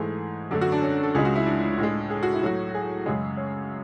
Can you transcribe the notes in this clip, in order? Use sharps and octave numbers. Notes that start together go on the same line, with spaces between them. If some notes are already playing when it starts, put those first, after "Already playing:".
Already playing: G#2 E3 A3 G#4
F#2 D3 A3 D4
F#4
D4
C#4
A4
C#2 C#3 G#3 G#4
F#4
E4
D4
A2 G#3
G#4
F#4
E4
A2 F#3 A3 F#4
G#4
F#2 C#3 G#3
C#5